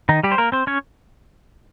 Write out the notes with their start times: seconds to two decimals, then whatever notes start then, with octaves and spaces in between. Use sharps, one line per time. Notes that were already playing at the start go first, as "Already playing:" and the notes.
0.09 D#3 D#4
0.23 G3 G4
0.32 C5
0.38 A#3 A#4
0.52 C4 C5
0.67 C#4 C#5